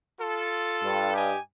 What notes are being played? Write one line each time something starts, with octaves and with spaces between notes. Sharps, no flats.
F4 A4
G2
G4 D#5 G#5